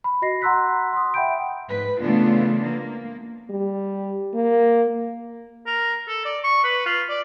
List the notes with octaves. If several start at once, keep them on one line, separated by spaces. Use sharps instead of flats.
B5
F#4 D#5 A#6 C7
F#5 A#5 C6 E6 F#6 B6
C6 D#6
E5 F#5 G5 B5 G6 D7
G#2 B4
C#3 E3 A3 B3 D4 F4
A#3
G3
A#3
A#4
A4
D5
C#6
B4
F4
D5